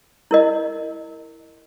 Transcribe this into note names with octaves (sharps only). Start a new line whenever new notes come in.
E4 A#4 D#5